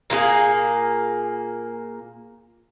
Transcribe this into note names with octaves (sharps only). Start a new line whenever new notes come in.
A#2 A#3 F4 G#4